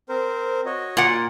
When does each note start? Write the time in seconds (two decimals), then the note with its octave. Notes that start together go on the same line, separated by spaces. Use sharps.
0.09 C4 A#4 C5
0.66 F#4 C#5 D#5
0.97 A#2 F#5